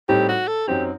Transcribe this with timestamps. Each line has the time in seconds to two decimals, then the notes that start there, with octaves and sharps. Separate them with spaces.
0.09 A2 G3 C4 D#4 G4
0.29 F#4
0.48 A4
0.68 F#2 F#3 C4 D#4 G4